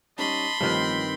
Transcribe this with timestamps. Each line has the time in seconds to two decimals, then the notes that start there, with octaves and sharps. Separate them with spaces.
0.18 G3 C#4 D#4 D#5 A5 B5 C6
0.61 A1 G2 D#3 F3 C4 B4